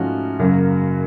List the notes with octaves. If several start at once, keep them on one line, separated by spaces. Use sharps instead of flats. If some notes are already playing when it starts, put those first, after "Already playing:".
Already playing: G#2 F3 A3 C#4 F#4
F#2 C#3 F#3 A#3